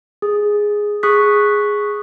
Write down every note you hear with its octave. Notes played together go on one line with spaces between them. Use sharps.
G#4
G#4 C#6 D#6 F#6 B6